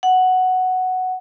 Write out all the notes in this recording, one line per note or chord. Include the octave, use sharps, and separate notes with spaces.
F#5